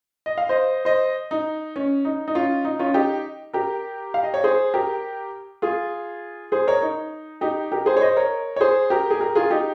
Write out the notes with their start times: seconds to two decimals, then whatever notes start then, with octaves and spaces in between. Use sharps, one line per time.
0.26 D#5
0.38 F5
0.49 C5 D#5
0.85 C5 D#5
1.31 D#4
1.76 C#4
2.05 D#4
2.28 D#4
2.35 C#4 F4
2.65 D#4
2.79 C#4 F4
2.94 D#4 G4
3.53 G4 A#4
4.14 F5
4.23 D#5
4.34 C#5
4.44 G#4 C5
4.74 G4 A#4
5.62 F4 G#4
6.52 G#4 C5
6.67 A#4 C#5
6.82 D#4
7.41 D#4 G4
7.72 G4 A#4
7.86 G#4 C5
7.97 C#5
8.01 C5 D#5
8.17 A#4 C#5
8.56 C#5
8.61 G#4 C5
8.90 G4 A#4
9.10 G#4
9.20 G4 A#4
9.35 F4 G#4
9.50 D#4 G4